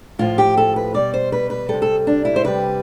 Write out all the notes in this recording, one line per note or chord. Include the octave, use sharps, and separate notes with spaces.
A2 F3 F4
G4
A4
B4
B2 G3 D5
C5
B4
B4
C3 G3 A4
A4
D4
E4
C5
C3 G3 B4